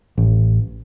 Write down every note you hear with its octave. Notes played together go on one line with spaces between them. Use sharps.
A1